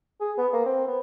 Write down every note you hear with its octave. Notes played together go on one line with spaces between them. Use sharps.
G#4
B3
A#3
C4
B3